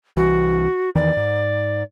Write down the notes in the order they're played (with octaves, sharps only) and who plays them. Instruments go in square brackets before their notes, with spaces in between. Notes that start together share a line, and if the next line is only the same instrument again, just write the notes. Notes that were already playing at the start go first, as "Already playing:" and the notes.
[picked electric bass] C2 E3 [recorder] F#4
[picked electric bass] E2 D#3 E3 [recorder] D5
[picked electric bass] G#2